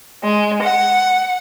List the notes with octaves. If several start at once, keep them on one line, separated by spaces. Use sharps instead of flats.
G#3
F#5